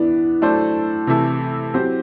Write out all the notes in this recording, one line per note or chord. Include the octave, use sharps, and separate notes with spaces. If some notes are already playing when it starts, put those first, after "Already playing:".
Already playing: E3 B3 D4 E4
F#3 A3 D4 A4 C5
C3 E3 A3 E4 A4
F#3 C4 G4 C5